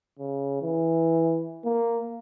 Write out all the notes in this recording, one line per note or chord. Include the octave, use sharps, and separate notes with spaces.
C#3
E3
A#3